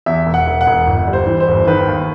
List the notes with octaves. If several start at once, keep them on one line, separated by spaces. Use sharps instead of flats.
E2 E5
E1
F#5
E1
F#5
E1
G1
G3
C5
E3
C5
G1
D#3 B4
D#2